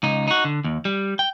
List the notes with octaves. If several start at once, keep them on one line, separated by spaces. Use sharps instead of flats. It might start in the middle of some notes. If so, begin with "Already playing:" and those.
C#2 D#4
D#4 F#4
D3
D#2
G3
G5